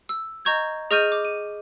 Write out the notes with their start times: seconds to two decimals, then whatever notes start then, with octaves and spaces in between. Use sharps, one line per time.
0.09 E6
0.45 D#5 A#5 C#6 G6 G#6
0.91 G#4 D#5 C#6 F6 G6 D#7
1.12 D6
1.25 D#7